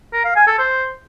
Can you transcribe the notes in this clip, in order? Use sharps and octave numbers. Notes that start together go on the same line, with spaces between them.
A#4
F5
G#5
A4
C5